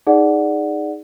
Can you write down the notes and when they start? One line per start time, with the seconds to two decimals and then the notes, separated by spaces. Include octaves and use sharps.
0.07 D#4 G#4 D5 F#5